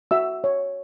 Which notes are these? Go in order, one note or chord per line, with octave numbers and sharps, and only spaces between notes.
F#4 E5 E6
C#5